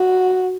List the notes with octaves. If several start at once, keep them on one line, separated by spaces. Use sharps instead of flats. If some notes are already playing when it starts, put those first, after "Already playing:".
Already playing: F#4